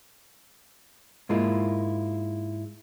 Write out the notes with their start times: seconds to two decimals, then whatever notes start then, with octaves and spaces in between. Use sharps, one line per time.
1.29 G#2 G#3 A#3 E4 F4